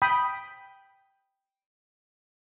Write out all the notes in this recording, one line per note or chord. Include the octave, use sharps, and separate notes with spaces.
G5 B5 D#6